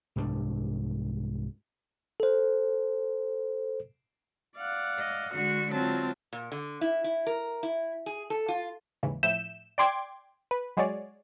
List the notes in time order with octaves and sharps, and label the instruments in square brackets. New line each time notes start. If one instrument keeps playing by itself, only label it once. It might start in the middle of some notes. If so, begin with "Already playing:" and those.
[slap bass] C2 G#2 F3 D4
[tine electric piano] A4 C5
[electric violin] D5 [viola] F5 F#5
[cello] D#5
[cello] D3 G#3 [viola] F#4 [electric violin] C#7
[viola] F#3 F4 [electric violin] C4 A5
[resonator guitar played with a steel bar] A#2
D3
E4
E4
A#4
E4
G#4
A4
F4
[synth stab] D#2 G#2 C#3 E3
A2 F3 E5 G6 E7
D5 G5 C6 D6 G#6
B4
F#3 G#3 F#4 G#4 C#5 D5